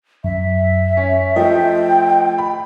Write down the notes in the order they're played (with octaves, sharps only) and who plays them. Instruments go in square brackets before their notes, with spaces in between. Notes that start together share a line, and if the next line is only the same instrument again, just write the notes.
[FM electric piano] F#2 [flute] E5
[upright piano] C#4
[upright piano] F3 A3 [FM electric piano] D#5 [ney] G5
[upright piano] B5